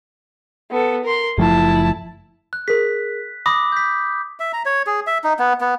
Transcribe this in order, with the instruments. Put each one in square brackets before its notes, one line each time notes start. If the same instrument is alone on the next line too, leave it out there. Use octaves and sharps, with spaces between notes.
[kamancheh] B3 A4
A#4 C6
[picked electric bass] F#1 F3 A3 [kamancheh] E4 A5
[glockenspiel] F#6
[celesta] G#4 A#4 [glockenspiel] B6
[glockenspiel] B5 D6 D#6 [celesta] A#6
[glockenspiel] G6 B6
[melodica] E5
A#5
C#5
G#4
E5
D#4
B3
B3